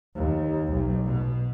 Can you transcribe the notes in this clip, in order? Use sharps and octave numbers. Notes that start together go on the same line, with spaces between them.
D#2
B1
B2